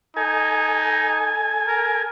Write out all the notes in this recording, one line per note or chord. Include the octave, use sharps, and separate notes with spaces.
D#4 A4 G#5
A#4